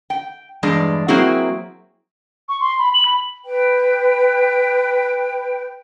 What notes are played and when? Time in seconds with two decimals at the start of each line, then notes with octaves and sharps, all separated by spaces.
0.10 G5
0.63 E2 G2 G#3 D4
1.08 F#3 A#3 C4 E4 F#4 G#4
2.49 C#6
2.60 C6
2.79 B5
2.93 F#7
3.05 B5
3.44 B4 G5